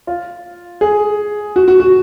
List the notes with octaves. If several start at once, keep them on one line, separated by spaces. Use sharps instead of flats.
F4
G#4
F#4
F#4
F#4